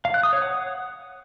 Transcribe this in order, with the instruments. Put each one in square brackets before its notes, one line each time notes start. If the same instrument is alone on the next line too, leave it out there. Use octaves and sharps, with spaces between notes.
[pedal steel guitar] F5
F#6
D#6
C#5
F#5